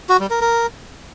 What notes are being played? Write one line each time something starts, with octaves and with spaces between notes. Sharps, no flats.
F#4
G3
A#4
A#4